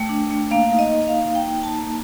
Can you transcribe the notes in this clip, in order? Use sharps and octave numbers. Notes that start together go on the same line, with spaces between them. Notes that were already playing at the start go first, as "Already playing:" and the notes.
Already playing: A3 G5
D4
A3
A#3 F5
D#4
D#5
A#3
F5
D#4
A#3 G5
D#4
A5
A#3